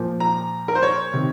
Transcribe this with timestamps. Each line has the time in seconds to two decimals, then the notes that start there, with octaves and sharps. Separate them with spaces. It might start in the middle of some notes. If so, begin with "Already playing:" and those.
Already playing: A#2 F3
0.20 A#5
0.68 A#4
0.75 C5
0.83 C#5
1.13 C3 D#3